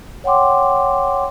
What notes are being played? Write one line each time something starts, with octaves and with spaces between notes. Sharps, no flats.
C#5 F#5 G5 C6 D6